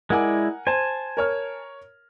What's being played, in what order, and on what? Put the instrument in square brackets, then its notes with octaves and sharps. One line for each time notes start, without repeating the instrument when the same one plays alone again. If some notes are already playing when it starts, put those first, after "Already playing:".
[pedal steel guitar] G#3 E4 D5 [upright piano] A#4 F#5 G#5
[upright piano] C5 [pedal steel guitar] G#5 A5
[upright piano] A#4 C#5 F6